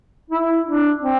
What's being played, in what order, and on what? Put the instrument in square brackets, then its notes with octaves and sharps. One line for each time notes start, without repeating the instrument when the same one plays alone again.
[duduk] E4
D4
C4